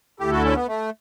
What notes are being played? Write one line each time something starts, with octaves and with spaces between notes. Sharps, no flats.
D2 D3 A3 E4 G4 A4
F#4
C#4
B3
A3